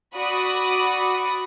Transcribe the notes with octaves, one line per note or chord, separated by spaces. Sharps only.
F#4 D5 B5 D#6